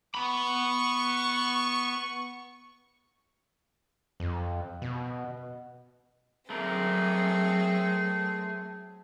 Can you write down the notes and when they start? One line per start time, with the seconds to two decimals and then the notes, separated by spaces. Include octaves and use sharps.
0.15 B3 B5 C#6
4.20 F2
4.82 B2
6.50 F#3 A3 C4 G#4 A#4